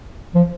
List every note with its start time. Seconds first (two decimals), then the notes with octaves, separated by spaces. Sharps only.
0.35 F3